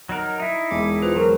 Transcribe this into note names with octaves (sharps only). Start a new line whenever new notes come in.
F#3 D#4 A#4
D#4 E4 E5
E1 G#3 D6
F4 B4 C5
F#3 A#4